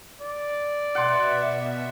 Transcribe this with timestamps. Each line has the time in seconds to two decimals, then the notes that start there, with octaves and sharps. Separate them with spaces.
0.21 D5
0.95 B2 E5 F#5 C6